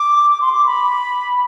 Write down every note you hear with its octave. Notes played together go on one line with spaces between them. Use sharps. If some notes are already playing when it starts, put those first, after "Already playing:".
Already playing: D6
D6
C6
D6
B5